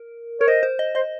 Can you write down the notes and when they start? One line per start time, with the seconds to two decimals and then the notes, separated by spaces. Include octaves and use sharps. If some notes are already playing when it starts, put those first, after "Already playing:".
Already playing: A#4
0.40 A#4 C#5
0.48 C5 D#5
0.63 C5
0.79 D#5
0.95 C5 D#5